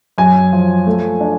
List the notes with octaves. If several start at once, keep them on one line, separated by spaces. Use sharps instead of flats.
F#2 G#5
F3
A3
D4